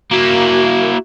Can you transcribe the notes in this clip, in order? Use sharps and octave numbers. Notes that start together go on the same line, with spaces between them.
A#3 E4 F#4